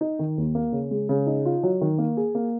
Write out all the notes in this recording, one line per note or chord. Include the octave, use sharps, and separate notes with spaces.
D#4
D#3
D#2
A#3
C#3
G#3
C#3
D#4
F4
F#3
D#3
A#3
G#4
A#3